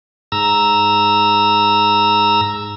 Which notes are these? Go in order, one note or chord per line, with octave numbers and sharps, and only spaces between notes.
G#2 A#5 E6